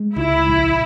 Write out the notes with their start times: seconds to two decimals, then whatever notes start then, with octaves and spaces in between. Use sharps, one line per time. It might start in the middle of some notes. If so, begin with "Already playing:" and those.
Already playing: G#3
0.16 C#2 E4
0.48 A#1